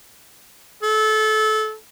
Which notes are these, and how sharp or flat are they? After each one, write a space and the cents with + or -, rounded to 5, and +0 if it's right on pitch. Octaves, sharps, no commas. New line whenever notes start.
A4 -25